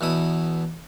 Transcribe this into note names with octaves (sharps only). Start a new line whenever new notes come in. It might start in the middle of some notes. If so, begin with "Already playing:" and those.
E2 B2 E4 D#6